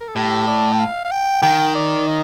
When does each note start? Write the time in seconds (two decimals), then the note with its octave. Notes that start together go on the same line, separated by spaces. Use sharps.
0.01 A#4
0.08 A4
0.15 A2 G4
0.47 D5
0.72 G5
0.79 F5
1.05 F5
1.11 G5
1.42 D#3 G5
1.75 D5
2.07 D#5